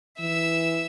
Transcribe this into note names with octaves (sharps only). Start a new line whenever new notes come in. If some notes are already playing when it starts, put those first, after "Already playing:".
E3 E5 E6